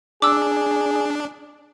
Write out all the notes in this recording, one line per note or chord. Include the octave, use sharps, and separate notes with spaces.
D4 G#4 D6 E6